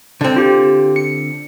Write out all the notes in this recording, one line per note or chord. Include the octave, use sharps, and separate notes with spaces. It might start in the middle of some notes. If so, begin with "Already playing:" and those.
D3 C4
F4 G4
C#7